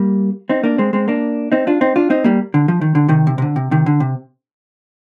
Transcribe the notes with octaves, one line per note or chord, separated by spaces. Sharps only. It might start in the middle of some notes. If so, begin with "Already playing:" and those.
Already playing: G3 A#3
C4 D#4
A#3 D4
G#3 C4
G#3 C4
A#3 D4
C4 D#4
D4 F4
C4 D#4
D4 F4
C4 D#4
G3 A#3
D3
F3
D#3
D3
C3 D#3
C3
C3
D3
C3
C3 D#3
D3
C3